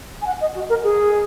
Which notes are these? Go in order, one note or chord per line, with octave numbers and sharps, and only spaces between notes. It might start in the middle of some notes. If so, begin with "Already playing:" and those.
G#5
F#5
D#5
F#4
A#4
G#4